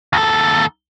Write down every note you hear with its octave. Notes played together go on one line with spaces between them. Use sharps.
D#2 A4